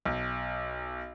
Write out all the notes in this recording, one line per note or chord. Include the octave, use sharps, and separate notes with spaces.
B1